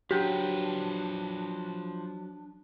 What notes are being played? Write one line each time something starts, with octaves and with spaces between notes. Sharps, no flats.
F3 F#3 D4 G4 B4 G5